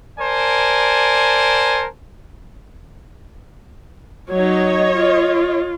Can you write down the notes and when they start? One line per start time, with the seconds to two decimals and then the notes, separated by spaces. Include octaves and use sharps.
0.19 A#4 C5 D5 G#5 A5
4.31 F#3 D#4 C#5 D#5
4.92 F4